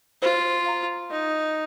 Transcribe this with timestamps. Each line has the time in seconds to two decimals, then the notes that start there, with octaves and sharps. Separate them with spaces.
0.22 F4 C5
0.66 F5 A#5
1.10 D#4 D#5